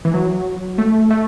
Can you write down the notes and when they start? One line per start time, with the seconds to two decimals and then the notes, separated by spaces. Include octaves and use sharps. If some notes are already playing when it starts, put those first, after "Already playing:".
0.05 E3
0.14 F#3
0.78 A3
1.10 A3